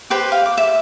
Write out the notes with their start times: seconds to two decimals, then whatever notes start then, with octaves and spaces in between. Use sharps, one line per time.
0.10 G4 B4 C5 G5
0.32 F5
0.46 D6
0.58 E5